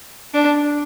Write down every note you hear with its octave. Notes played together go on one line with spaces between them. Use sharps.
D4